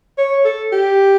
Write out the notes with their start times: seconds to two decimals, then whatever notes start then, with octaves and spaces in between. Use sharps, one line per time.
0.18 C#5
0.45 A4
0.72 G4